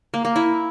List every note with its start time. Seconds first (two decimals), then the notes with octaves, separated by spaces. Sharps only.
0.14 A#3
0.25 A#3
0.36 E4